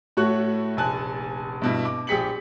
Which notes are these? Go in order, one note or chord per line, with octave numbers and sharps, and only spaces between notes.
A2 A3 F#4 C#5 F#6
F1 A#1 G#5 A5 F#6
G2 B2 E4
D6
A#1 G4 G#4 B6 C#7 F#7